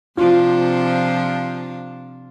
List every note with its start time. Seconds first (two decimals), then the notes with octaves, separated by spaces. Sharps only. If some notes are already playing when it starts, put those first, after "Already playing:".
0.17 C3 F3 D4 F4